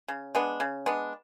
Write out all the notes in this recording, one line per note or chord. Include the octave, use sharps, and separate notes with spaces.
C#3
G#3 B3 D4
C#3
G#3 B3 D4